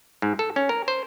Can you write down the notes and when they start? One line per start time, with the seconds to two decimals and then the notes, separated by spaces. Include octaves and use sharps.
0.22 G#2
0.39 A4
0.56 C#4
0.69 A#4
0.88 C5